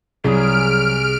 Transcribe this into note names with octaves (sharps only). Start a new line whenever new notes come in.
C2 F#3 G#4 F6 D7